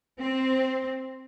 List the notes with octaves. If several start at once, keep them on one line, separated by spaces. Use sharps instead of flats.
C4